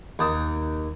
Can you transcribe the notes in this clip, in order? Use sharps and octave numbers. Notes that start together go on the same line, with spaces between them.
D#2 A5 D#6